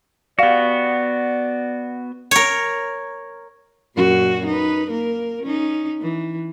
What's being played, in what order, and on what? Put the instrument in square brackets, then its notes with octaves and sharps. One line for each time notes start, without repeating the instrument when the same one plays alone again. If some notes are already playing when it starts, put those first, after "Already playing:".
[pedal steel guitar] B3 F#4 [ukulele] G4 F5 [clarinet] D5
[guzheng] A#4 C#5
[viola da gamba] F#2 A#2 F#4
D#4 B4
A#3 A#4
C#4 D#4
E3